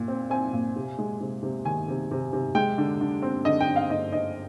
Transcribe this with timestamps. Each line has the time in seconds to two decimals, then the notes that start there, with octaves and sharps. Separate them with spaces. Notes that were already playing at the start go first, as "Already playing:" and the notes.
Already playing: A#2
0.08 C4
0.30 C4 G#5
0.53 A#2
0.76 C3
0.98 G#3
1.21 C3
1.43 C3
1.65 D#3 G#5
1.88 C3
2.11 C3
2.33 C3
2.55 G#3 G5
2.78 D3
3.01 D3
3.22 C4
3.45 D3 D#5
3.60 G5
3.68 D3
3.76 F5
3.90 D3 D#5
4.12 D3 D#5